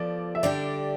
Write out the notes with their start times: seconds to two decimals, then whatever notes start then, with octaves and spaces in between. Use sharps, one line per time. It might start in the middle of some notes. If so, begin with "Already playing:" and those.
Already playing: F3 B3 F4 A4 D5
0.35 E5
0.43 D3 G3 D4 G4 D5